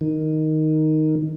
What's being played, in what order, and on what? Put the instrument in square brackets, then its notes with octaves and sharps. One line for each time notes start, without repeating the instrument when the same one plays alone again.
[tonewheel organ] D#3